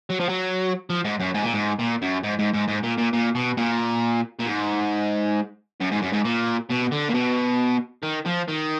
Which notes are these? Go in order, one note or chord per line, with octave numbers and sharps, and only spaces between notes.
F#3
F3
F#3
F3
G#2
F#2
G#2
A#2
G#2
A#2
F#2
G#2
G#2
G#2
G#2
A#2
A#2
A#2
B2
A#2
A#2
G#2
F#2
G#2
F#2
G#2
A#2
B2
D3
A#2
B2
D#3
F3
D#3